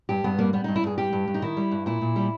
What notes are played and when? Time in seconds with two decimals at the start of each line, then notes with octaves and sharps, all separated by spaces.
0.09 G2 G4
0.24 G2 B3
0.39 G3 A#3
0.53 G3 B3
0.64 G2 D#4
0.76 E4
0.83 G2 G#4
0.98 G3 G4
1.13 G2
1.28 G2
1.34 D#4
1.42 D#3 E4
1.57 G3
1.71 G2
1.86 A#2 E4
2.01 A#2
2.16 G3